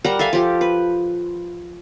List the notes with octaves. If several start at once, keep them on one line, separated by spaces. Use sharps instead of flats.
G3 A#4 F#5 A#5
A4 E5 F5 G#5
F3 G4
B4